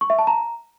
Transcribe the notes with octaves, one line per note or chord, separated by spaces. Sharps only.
C#6
E5
A5
A#5